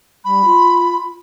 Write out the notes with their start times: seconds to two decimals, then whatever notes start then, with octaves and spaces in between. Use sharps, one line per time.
0.25 G3 B5
0.45 F4